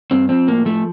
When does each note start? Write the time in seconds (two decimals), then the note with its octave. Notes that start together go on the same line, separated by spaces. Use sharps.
0.11 G2 C4
0.29 F3 C4
0.48 A2 A#3
0.65 F3 A3